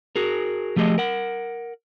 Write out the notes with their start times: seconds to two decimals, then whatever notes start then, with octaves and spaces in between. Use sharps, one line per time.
0.16 F#4 G#4 A#4
0.76 F3 A3 G4 G#4 D#5
0.98 A#4 F#5